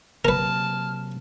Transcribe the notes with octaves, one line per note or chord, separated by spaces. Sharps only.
C3 F#3 A#3 A#4 B4 A5 F6